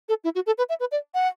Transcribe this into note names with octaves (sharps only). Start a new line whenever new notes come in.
A4
E4
F#4
A4
B4
E5
B4
D5
F#5